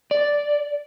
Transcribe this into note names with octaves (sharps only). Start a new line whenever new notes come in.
D5